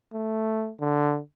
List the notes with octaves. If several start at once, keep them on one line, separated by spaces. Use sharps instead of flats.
A3
D3